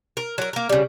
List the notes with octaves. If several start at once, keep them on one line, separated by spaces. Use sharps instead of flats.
A#4
F#3 A#4
A#3 A#4
C#3 G3